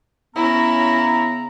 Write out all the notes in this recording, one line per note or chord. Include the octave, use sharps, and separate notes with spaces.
C#3 B3 C#4 E4 A#5